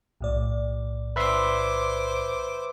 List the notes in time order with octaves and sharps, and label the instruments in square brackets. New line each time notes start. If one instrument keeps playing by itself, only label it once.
[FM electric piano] B1 A2 D5
[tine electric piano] B4 E5 C6 [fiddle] C5 D6